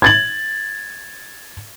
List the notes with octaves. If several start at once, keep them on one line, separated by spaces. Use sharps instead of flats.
G#6 A6 F#7